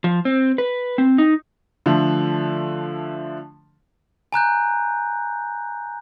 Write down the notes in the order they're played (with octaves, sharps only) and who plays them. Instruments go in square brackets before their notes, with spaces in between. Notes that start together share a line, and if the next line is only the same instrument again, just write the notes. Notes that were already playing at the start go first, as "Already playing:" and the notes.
[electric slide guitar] F3
C4
B4
C4
D#4
[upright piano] D3 F3 A3
[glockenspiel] G#5 A#5 F#6 G6